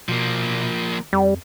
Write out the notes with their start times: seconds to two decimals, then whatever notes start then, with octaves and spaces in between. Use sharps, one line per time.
0.09 B2 F3 A#3
1.13 F2 G3